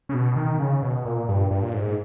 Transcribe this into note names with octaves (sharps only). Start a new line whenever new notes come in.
C#3
B2
D#3
C#3
B2
A#2
G2
G2
A#2
G#2